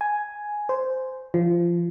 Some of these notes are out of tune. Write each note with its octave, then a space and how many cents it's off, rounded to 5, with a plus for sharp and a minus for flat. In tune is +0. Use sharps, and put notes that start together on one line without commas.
G#5 +5
C5 -10
F3 -20